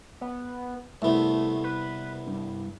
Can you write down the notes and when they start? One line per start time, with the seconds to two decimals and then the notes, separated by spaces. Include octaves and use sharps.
0.21 B3
1.02 C2 A3 B3
1.64 B4
2.27 G2